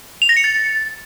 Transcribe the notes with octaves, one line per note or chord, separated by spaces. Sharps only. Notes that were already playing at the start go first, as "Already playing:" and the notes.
F7
A#6
C#7
A6